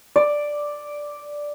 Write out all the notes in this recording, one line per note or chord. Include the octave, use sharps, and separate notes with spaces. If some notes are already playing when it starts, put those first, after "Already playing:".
D5